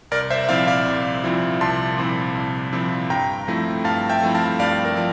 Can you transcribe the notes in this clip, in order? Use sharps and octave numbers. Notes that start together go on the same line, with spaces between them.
C2 A#4 D5
C5 E5
A#2 F3 C4 E4 D5 F5
D5 F5
C2
A#2 F3 C4 E4
C2 A5 C6
A#2 F3 C4 E4
C2
A#2 F3 C4 E4
G2 G5 A#5
F3 A3 C4 E4
G2 F5 A5
E5 G5
F3 A3 C4 E4
F5 A5
G2 D5 F5
A#4
F3